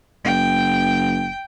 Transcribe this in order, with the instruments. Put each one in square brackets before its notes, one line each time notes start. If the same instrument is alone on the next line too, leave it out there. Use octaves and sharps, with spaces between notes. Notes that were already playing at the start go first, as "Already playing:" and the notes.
[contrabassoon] F#1 [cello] G5